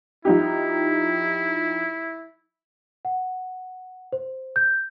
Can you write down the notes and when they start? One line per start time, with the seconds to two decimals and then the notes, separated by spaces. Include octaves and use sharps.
0.25 F3 D#4 E4 G4
3.05 F#5
4.13 C5
4.56 G6